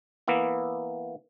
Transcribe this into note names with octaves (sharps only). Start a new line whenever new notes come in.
E3 A#3 B3 E4